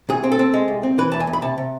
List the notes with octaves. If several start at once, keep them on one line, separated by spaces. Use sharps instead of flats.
C2 G#4
C4
A4
C4
G#3
C2
C4
E3 B4
E2 A5
G#5
E2
B5
C3 A5
C3